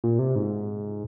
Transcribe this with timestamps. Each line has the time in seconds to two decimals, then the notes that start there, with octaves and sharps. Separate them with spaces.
0.04 A#2
0.19 C3
0.35 G#2